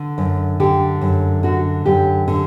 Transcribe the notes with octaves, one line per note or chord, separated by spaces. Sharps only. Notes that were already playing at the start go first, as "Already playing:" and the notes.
Already playing: D3
F#2
D3 G4
F#2
D3 F#4
F#2 G4
D3